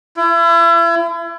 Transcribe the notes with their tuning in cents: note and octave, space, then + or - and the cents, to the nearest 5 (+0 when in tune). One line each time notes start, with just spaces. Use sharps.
E4 +35